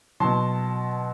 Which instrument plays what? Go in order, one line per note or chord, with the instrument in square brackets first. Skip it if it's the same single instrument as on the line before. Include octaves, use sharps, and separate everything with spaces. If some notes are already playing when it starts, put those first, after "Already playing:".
[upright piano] B2 F#3 A5 C6